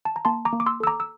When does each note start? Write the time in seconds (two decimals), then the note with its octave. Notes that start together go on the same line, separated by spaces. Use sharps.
0.05 A5
0.16 A#5
0.25 A#3 A5 C6
0.45 A#5 D6
0.53 A#3
0.60 D6
0.66 C6 E6
0.80 A4 E6
0.87 A#5 D6
1.00 E6